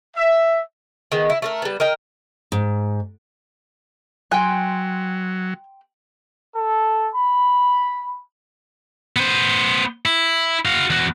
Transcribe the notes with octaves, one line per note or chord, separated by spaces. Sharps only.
E5
D#3 G#3 B3
E4
A3 A4 A#4
G3 B3
A#4 D#5 G5
G#2
F#3 G5 G#5 C6 F#6
A4
B5
B3 C5
E4
F#4 F5
E2 F#4